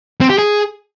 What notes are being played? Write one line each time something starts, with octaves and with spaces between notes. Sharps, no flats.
C4
G4
G#4